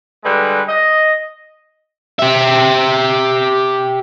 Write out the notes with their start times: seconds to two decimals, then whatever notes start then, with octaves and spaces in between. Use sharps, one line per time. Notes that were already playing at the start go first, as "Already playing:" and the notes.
0.24 D3 G3 G#3 B4
0.68 D#5
2.19 G4 E5